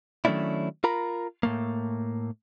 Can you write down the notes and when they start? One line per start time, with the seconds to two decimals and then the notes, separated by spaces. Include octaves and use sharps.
0.25 D#3 F#3 A3 C#4 D4 E4
0.84 F4 A#4 A#5 B5
1.43 A2 A3 A#3